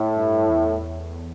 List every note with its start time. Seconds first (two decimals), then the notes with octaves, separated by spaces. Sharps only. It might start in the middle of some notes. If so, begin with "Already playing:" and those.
Already playing: A2
0.17 G2
0.49 E2